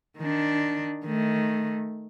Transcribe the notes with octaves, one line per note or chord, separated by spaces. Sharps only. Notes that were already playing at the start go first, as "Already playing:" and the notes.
D#3 D4
D#3 A3